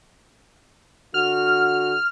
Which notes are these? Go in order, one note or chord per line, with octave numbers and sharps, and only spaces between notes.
D3 F#4 F6